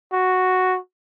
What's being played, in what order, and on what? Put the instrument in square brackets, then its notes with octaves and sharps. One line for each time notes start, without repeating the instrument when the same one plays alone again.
[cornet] F#4